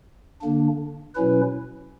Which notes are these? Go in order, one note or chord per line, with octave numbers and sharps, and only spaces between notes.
D3 A#3 D4
B2 F#3 C#4 E4 B4